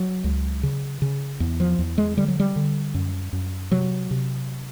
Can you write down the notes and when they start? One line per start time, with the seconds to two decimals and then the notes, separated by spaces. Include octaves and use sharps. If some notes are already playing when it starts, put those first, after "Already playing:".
Already playing: F#3
0.24 C#2
0.63 C#3
1.02 C#3
1.40 E2
1.60 F3
1.79 E2
1.98 G#3
2.17 D3 G3
2.28 F#3
2.40 G3
2.56 D3
2.94 F#2
3.33 F#2
3.72 C3 F#3
4.11 C3